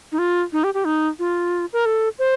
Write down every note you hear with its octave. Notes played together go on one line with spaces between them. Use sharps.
D#4
F4
D#4
G4
G4
D#4
F4
A#4
A4
C5